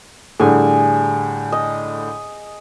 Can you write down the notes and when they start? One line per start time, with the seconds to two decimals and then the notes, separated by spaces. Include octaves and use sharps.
0.40 A2 D3 G3 G#4 G#5
1.52 D#5